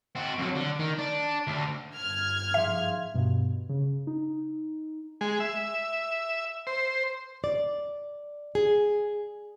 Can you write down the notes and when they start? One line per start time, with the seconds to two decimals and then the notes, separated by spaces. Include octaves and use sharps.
0.15 C4 F#4
0.39 F2 F#3
0.56 D3
0.79 D#3
0.98 D4
1.47 D2 D3
1.96 G1 F6 G#6
2.54 G#2 F3 E5
3.14 G2 B2
3.69 C#3
4.07 D#4
5.21 G#3
5.40 E5
6.67 C5
7.44 D5
8.55 G#4